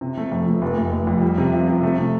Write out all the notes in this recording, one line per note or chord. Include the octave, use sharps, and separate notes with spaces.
C3
A3
F2
A3
F1
F1
F1
F2
G3
C3
F4
C3
A3
C3